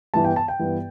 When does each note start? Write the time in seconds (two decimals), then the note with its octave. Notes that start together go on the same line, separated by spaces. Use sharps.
0.14 G2 E3 B3 A5
0.24 G5
0.36 A5
0.48 G5
0.59 G2 E3 B3